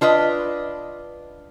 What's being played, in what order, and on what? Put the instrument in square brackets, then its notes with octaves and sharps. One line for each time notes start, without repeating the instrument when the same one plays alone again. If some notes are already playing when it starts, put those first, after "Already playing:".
[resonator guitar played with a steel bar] D4 F4 B4 D#5